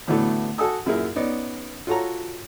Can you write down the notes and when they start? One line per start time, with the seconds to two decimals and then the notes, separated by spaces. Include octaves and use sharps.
0.08 A2 D3 E3 F#3 A3 B3
0.58 F#4 A4 F#5 G#5 D#6 E6
0.86 F#2 A#2 E4 G#4 A#4
1.16 B3 C#4 D#4 D5
1.87 F4 F#4 A4 C#5 A#5